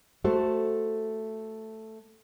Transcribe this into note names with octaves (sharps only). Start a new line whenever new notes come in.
A3 F#4 A4 C5